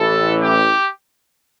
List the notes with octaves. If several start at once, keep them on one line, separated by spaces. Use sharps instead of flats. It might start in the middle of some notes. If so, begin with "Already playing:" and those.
Already playing: A1 A2 E3 A4
G4